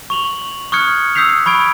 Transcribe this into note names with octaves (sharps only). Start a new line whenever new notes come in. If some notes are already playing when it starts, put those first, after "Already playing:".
C#6 F7 F#7
C#6 D#6 F6 F#6 G#6 C#7
D#6 E6 G6 B6 C7 F7
B5 C#6 G#6 D7